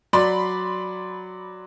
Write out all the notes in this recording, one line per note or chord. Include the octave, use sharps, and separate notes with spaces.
F#3 D5 B5 C6